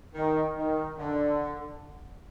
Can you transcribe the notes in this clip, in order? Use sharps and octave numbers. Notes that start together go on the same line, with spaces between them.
D#3
D#3
D3